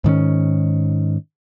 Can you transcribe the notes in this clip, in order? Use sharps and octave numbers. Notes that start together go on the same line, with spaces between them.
G#2 D#3 C4 C#4